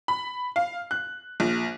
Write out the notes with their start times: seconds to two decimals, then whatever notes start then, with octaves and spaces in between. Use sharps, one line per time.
0.08 B5
0.56 F5
0.91 F#6
1.40 A#1